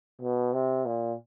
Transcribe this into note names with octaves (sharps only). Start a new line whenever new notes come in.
B2
C3
A#2